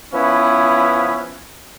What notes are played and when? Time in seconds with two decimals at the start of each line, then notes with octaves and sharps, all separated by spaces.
0.13 F3 B3 C#4 E4 B4